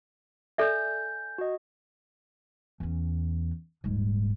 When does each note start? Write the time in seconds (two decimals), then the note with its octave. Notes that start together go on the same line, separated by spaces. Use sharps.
0.58 A4 D5 E5 G#5 G6
1.38 F#4 D#5
2.80 E2 C#4
3.84 D#1 G#2